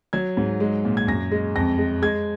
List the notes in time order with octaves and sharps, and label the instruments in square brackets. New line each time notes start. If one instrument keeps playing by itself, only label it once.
[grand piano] F#3 G#6
G#2
G#3
A#2
G#6
F#2 A#6
G#3
F2 A#6
G#3
G#3 G#6